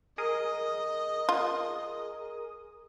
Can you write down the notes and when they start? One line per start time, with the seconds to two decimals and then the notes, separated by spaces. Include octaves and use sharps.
0.18 G#4 A#4 D#5 D#6
1.29 F4